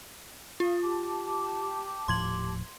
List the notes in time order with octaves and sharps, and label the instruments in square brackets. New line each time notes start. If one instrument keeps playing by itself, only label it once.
[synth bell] F4 [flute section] F5 D#6
[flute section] G4 A5 D6
[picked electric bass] D#1 A2 F3 [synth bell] C6 G#6 F#7